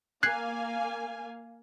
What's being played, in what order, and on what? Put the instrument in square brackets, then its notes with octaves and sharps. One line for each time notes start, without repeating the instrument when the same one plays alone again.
[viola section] A#3 F5 G#5 [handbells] F#6 G#6 C7